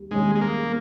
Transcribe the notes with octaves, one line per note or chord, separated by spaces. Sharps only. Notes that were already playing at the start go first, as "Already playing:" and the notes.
Already playing: D#2 D#3 G3
D#2 D#3 G3 G#3 C#4 G#4
G#3
A#3